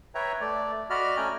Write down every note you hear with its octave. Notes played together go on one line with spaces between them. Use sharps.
B4 C#5 E5 G5 A#5
A3 D5
F#4 D5 D#5 B5 F6
A3 C#4 G5 G#5 A#5